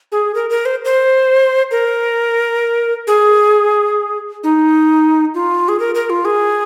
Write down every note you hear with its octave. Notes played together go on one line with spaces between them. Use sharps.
G#4
A#4
A#4
C5
C5
A#4
G#4
D#4
F4
G#4
A#4
A#4
F4
G#4